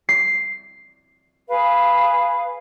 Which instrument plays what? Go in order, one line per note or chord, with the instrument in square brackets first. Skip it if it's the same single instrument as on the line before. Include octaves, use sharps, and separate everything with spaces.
[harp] C7
[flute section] G#4 B4 F5